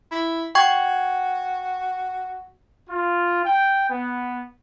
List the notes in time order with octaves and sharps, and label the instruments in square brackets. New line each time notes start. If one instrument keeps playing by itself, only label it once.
[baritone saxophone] E4
[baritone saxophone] F#4 [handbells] G5 C#6 G#6
[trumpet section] F4
G5
B3